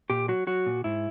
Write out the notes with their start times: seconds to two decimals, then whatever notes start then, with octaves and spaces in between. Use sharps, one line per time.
0.10 A#2 G4
0.28 F#3 F#4
0.47 F#3 F#4
0.66 A#2
0.84 G#2 E4